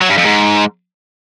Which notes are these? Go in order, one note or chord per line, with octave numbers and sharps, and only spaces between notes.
F#3
G2
F2
G#2